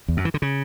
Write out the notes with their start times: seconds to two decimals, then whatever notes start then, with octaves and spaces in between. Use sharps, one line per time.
0.08 E2
0.17 F#2
0.25 E3
0.34 D3
0.42 C#3